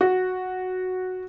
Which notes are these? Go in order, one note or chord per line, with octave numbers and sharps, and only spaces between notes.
F#4